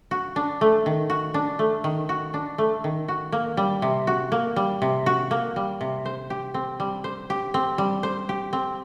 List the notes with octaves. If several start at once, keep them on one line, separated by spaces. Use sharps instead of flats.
F#4
D4
A3
D#3
F#4
D4
A3
D#3
F#4
D4
A3
D#3
F#4
A#3
G3
C3
F#4
A#3
G3
C3
F#4
A#3
G3
C3
C5
G4
C4
G3
C5
G4
C4
G3
C5
G4
C4